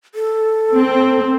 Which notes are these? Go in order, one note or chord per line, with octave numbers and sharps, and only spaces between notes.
A4
C4